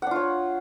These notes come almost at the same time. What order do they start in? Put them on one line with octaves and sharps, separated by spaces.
F#5 D4 F4 C#5